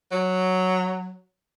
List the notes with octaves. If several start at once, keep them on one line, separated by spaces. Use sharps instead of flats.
F#3